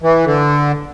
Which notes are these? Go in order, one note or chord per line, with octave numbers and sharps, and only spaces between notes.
E3
D3